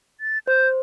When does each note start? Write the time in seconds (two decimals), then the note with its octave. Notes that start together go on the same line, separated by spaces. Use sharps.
0.21 A6
0.47 C5 G6